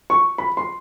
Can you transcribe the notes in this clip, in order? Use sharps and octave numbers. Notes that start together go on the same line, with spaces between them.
C#6
B5
C6